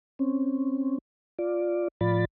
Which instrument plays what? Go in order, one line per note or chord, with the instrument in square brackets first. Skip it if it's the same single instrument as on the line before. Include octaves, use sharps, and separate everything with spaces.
[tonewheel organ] C4 C#4
F4 D5
A2 F3 F4 D5 B5 A6